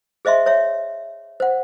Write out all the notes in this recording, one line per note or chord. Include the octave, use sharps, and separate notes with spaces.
G#4 C5 D#5 E5 C6
C#5 E5
C5 F#5